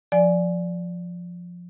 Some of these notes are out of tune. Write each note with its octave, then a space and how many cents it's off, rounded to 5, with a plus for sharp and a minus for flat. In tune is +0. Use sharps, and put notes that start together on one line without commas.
F3 +10 D5 +0 G#5 +10